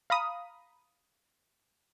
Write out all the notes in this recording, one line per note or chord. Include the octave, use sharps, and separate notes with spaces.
F5 A#5 B5 D#6